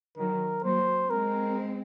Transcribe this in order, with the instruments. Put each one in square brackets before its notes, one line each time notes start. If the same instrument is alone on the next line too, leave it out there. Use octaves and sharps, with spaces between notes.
[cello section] D#3 F#3 [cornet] A#4
[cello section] F#3 A#3 [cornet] C5
[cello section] G#3 C4 [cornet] A#4